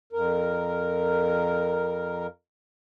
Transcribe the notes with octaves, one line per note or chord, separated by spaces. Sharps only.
F2 A#4